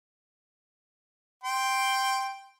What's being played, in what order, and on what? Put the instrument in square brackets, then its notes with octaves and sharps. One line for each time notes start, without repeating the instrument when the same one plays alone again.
[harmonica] G5 C6